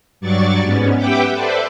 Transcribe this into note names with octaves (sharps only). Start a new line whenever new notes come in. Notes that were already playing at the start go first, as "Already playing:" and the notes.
G2 F#3 D5 C#6 A6
G#2 B3 C#4
G4 B4 E5 F#5 G5 D6
A4 B4 C5 D5 E5